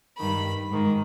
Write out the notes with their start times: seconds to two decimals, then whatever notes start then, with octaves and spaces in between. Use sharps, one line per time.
0.18 G2 D#3 B5
0.70 G#2 D#3